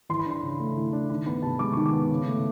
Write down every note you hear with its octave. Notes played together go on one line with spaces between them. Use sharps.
E3 C6
B5
D4 C6
C#3
A3
E3
D4
D#3 B5
B3 B5
C3 A5
G#3 D6
D#3 C#6
D6
B3
C#3
A3